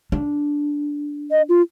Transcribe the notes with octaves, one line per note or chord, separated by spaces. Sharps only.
D4
D#5
F4